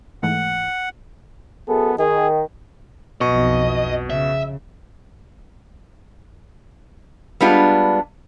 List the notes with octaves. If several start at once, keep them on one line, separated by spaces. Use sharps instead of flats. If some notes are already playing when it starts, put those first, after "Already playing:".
G#2 E3 A3 F#5
F#2 B3 G#4 A4
D#3 G#4
B1 F2 B2 D#5 C#6
C#3 E5
G3 G#3 B3 D4 F4